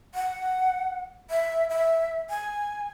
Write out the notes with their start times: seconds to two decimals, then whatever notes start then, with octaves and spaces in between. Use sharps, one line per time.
0.15 F#5
1.30 E5
1.70 E5
2.30 G#5